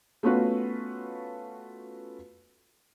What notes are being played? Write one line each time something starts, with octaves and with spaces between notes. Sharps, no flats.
A3 B3 C#4 F4 F#4 B4